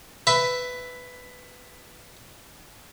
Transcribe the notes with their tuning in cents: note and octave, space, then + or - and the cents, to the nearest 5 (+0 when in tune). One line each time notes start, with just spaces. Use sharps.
B4 +10 E5 +0